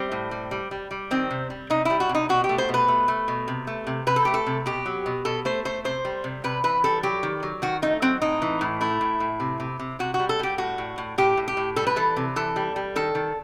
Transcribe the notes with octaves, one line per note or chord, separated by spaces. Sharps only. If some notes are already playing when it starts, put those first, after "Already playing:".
Already playing: G3 C4
A2
G3
G3
G3
G3
D#3 C4
C3
G3
C3 D#4
G3 E4
F#4
C3
D#4
B2 F#4
G4
A3
C5
B2
B4
A3
A3
B2
C3
A3
C3
C3 B4
A4
A3 G4
A4
C3
B2 G4
F#3
B2
B2 A4
A3 C5
A3 C5
C3 C5
G3
C3
C3 B4
E3 B4
G3 A4
F#3 G4
D#3
F#3
D#3 F#4
A3 D#4
F#3 C4
A2 D#4
E3
A2
A3 E4
A2
A2
C3
C3
C3
C3 F#4
F#4
G3
A4
G3 G4
A2 F#4
A2
A2
A2 G4
A2
G4
A2
G3 A4
B4
E3 A4
C3
E3 A4
G3
G3
D#3 A4
D#3